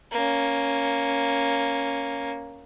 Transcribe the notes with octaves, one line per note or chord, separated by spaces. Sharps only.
A#3 C#4